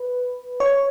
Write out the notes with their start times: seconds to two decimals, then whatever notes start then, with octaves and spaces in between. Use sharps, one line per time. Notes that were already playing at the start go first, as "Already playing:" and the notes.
Already playing: B4
0.60 C#5